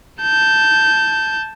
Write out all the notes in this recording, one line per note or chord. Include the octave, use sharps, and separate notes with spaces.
A5 G6